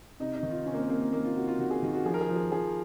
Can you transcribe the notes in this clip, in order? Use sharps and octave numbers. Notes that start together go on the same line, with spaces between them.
C3 D#4
D#4
D#3
F4
C3 C#4
A#3
C4
C3 A#3
A#3
D#3 A#3
F4
C3 F#4
F4
D#3 F#4
G#4
D#3 F#4
F#4
F3 G#4
A#4
G#4
F3
G#4
F3 G#4